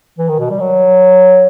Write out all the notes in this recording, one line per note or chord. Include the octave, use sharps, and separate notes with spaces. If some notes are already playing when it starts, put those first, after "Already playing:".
E3
D#3
B2
G3
F#3